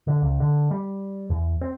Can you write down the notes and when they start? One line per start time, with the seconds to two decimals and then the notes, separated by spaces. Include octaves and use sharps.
0.07 D3
0.22 C#2
0.40 D3
0.71 G3
1.30 E2
1.61 C4